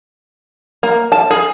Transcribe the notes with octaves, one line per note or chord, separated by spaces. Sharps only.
A#3
A5
G#4